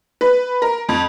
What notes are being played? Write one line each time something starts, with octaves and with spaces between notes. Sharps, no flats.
B4
A#4
F2